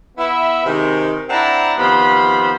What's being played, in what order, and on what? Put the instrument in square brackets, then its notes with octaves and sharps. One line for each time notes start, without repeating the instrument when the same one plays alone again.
[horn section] B3 E4 E5
C3 D#3 G#3
C4 D4 E4 F#5 A5 A#5
C3 D#3 F3 B3 C5 B5